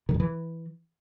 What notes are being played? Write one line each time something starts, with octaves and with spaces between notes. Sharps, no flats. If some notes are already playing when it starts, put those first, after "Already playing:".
D#3
G2
E3